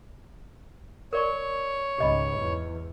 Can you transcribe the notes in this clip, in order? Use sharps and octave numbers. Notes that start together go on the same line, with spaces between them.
A#4 C#5 D5 C#6
C#2 G#2 G4 D#5 B5
E2